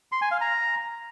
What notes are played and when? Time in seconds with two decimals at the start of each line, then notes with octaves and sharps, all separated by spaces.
0.12 C6
0.22 G#5
0.31 F5
0.41 A#5